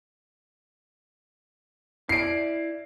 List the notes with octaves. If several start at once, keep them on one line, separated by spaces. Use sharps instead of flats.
E4 D5 C7 D7